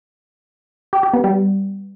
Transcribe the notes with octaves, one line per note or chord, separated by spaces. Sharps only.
G4
G4
B3
G3